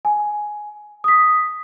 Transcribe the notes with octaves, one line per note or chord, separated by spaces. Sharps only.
G#5
D#6 B6